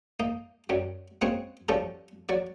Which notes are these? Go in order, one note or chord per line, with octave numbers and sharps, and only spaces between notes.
A#3 D#4
F#2 F#3 G3
G#3 A#3 C4 C#4 F#4 C#5
F3 G3 C#4 F#4 G4 A4
F#3 F#4 D5